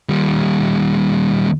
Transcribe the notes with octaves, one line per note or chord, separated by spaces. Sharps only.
D#2 G3